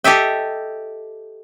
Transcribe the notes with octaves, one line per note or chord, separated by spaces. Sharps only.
G4 A4 D#5 E5 G5